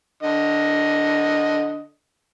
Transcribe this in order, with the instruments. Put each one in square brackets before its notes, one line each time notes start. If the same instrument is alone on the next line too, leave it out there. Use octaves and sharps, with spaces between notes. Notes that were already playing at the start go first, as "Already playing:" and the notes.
[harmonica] D3 D#5